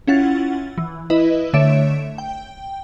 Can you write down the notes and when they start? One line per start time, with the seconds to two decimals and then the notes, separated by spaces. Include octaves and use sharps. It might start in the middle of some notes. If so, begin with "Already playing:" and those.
0.07 C#4 E4 F4 F#5 A6
0.78 E3
1.10 E4 B4 D#5
1.53 D3 A3 C#5 E5 D7 E7
2.18 G5